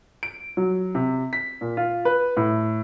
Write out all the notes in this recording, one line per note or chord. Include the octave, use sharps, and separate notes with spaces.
D7
F#3
C3
B6
A#2
F4
B4
A2